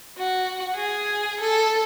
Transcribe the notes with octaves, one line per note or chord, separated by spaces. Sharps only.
F#4
G#4
A4